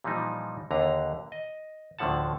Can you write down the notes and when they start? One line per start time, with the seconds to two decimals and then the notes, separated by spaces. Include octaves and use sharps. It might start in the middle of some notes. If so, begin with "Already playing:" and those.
0.04 A#2 E3 F3 G3 D#4
0.71 D#2 D3 B4 A#5
1.32 D#5
1.99 D2 A2 D3 F3 F#5 A5